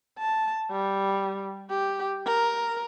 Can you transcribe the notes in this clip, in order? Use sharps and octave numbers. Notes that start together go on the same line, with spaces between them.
A5
G3
G4
A#4